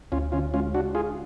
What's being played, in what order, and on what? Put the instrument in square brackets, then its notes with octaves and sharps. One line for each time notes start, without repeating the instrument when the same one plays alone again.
[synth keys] D2 [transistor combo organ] C#4 F4
[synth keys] D3 [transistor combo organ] C#4 F4
[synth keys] G#3 [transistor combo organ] C#4 F4
[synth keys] C#3 [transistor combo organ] D4 F#4
[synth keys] G#3 [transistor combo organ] F4 G#4